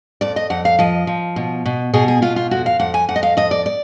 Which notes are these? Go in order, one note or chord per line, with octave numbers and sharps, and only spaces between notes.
F2 D5
D#5
F2 F#5
F5
F3 D#5
F3
B2
B2
B2 G#4
G#4
B2 F4
F4
F2 F#4
F5
F2 F#5
G#5
F2 F#5
D#5
F5
F2 D#5
D5
D5